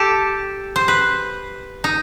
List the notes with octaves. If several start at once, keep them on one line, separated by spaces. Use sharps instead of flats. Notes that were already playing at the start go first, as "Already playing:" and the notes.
Already playing: G4 A4
C5
B4
D#4